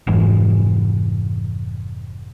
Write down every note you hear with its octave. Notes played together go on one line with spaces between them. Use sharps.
F1 G#2 E3